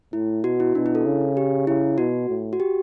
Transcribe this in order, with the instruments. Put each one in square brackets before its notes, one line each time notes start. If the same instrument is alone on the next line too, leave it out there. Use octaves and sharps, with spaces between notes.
[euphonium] A2 [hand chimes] E4
[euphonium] B2 [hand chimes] F#4
[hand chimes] E4
[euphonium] B2 [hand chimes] D4
[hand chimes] E4
A4
[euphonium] C#3
[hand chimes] G4
[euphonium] C#3 [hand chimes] E4
[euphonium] B2 [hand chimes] F#4
[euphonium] A2
[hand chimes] F#4
G4